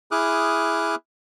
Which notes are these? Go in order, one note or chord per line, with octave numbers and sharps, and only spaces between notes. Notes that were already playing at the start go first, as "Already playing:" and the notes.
E4 G#4 D6 D#6 F6 F#6